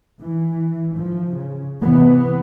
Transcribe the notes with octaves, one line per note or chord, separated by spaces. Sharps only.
E3
F3
C#3
C3 E3 B3